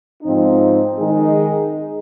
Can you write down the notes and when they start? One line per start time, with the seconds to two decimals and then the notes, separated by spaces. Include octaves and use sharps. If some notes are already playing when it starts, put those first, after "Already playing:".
0.23 G#2 F3 C4 D#4
0.98 D#3 G#3 D#4 G#4